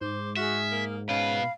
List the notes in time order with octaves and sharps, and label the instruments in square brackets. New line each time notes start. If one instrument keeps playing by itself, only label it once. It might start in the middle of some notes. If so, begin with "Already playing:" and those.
[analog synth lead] G#2 [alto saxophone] C5 [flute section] D6
[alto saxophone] F#4 [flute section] G#4 F6 [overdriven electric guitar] E5
[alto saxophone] A#3
[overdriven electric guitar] B2 B4 [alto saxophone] C#4 [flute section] F5 B5